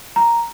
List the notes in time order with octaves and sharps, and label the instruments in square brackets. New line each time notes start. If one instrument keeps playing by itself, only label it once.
[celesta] A#5